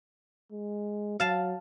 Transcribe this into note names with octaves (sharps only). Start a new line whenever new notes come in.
G#3
F#3 F5 A5